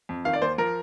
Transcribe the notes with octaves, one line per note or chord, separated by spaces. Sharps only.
F2
D#3 F5
D5
D#2 C5
F3 A#4